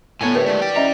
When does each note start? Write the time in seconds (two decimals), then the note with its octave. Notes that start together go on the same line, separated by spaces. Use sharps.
0.21 A2 B3 D#4 F4 G4 A4 C#5 G#5
0.35 D3 G#3 D4 G4 A#4 B4
0.46 G#3 A3 E4 A4
0.62 E3 G3 F#4 D5 G5
0.76 C#4 D#5 E5 A#5